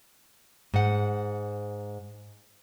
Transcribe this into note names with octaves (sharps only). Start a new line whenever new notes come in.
G#2 F#5